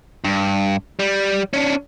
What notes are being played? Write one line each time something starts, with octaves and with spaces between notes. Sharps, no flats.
G2
G3
C#4 D4